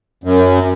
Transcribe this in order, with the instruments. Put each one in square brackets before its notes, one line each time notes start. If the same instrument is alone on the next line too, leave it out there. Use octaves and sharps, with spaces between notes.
[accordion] F#2